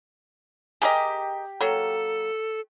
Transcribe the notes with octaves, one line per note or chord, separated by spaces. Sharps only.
G4 G#4 A#4 D#5
F#3 A#3 A4